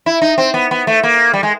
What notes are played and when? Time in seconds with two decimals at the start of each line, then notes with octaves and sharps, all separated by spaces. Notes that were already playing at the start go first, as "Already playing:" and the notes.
0.06 E4
0.22 D#4
0.38 C4
0.54 B3
0.71 B3
0.87 A3
1.03 A#3
1.33 G3
1.43 G#3